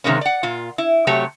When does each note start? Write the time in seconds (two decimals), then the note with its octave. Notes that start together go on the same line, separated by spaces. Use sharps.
0.04 C3 D#3 G#3 A#3 C#4
0.21 D5 F#5
0.43 A#2 F4
0.78 E4
1.07 C3 F#3 A3 G4 C#5